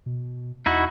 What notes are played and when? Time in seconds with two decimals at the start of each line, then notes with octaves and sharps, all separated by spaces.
0.06 B2
0.66 E2 D#4 E4 F#4